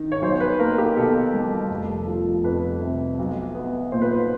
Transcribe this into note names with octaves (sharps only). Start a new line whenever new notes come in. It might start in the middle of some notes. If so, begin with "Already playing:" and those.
Already playing: D#3
C#5
B1 C5
B4
A#3 A#4
G4
B2 A4
G3
F1
F3
F2 B4
C3
B1
B3
A#2 C5
B4
C5